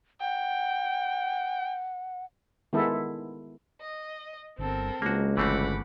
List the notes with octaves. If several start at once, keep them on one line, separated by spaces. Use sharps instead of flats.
F#5 G5
D#3 G#3 B3 E4 A4
D#5
G1 C4 A4 A#4
C#2 G#3 A#3 F#4
G1 E3 A3 C4 F#5 B5 D6